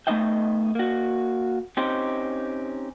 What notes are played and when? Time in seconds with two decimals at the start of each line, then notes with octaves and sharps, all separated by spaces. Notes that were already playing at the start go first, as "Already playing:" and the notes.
0.07 A3 B3 D#4 D#5 E5 G5
0.75 A#3 F#4
1.77 C4 C#4 D#4 G4 C5